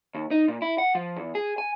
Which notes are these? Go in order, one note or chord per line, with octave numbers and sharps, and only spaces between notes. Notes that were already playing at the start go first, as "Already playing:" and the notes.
D#2
D#4
A#2
E4
F#5
F3
E2
G#4
G#5